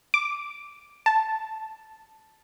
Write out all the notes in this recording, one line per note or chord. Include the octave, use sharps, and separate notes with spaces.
D6
A5